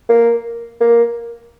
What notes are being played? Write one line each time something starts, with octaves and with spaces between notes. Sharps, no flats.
A#3
A#3